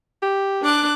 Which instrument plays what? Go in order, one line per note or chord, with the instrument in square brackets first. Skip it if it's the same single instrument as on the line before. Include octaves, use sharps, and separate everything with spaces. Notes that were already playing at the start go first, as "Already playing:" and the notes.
[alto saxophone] G4
[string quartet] D4 D6 F#6